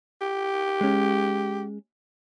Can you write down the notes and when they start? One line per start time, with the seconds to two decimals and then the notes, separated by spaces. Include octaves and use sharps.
0.21 G4
0.81 G#3 C#4